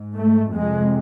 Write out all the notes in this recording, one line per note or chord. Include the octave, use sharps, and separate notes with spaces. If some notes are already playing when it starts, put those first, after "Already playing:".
Already playing: G#2
A3
F2 C3 G#3